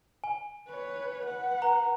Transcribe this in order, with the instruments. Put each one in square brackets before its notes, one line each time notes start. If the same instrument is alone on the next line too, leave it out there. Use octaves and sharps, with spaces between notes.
[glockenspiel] G#5
[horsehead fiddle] B4 C#5
B4 F#5
[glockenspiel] A#5